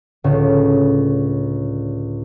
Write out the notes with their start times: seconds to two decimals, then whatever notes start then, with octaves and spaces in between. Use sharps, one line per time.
0.24 C#2 A2 D3 A3